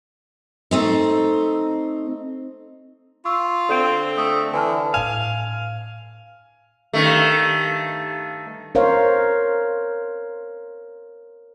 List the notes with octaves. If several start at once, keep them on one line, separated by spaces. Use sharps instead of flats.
A3 C4 D#4
F4 C#6 E6
D3 C4 A4 G6 D7
A3 D#6
D3 E3 G#5 A5 F6
A2 D4 F5 G#5
G2 D#3 A3
A#4 C5 C#5 F5